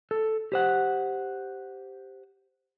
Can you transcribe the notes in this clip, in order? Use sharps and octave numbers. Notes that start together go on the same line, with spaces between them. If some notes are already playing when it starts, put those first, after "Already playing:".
A4
G4 C5 F#5